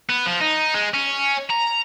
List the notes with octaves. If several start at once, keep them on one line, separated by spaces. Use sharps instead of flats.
B3
F3
D#4
G#3
C#4
A#5